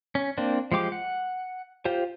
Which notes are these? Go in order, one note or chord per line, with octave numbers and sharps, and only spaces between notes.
C#4
A#3 C4 D4
F3 G#3 G4 D6
F#5
F4 G4 C5